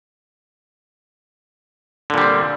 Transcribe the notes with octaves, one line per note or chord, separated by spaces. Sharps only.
A#2 D3 G3 C4